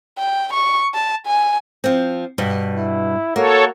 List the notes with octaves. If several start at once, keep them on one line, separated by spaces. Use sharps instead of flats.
G5
C#6
A5
G#5
F3 C4
G2 B2 G3
E4
A#3 F#4 A4 C#5